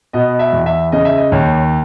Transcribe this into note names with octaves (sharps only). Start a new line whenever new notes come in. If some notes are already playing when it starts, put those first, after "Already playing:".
B2 D#5
E5
E2
E5
C#3 D#5
E5
D#5
D#2 C#5